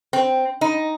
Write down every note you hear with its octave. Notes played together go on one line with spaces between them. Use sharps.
C4
D#4